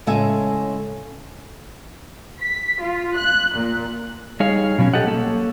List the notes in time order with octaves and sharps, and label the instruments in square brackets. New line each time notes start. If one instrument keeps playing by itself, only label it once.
[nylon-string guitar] A2 C#3 G#3 A4 E5 G#5
[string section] B6
F4
F#6
A#2
[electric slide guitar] G3 D#4 G#4 C#5 F5
B2 F#3 A#3 C#4
G4 A4 D#5 F#5
A#3 A4 C#5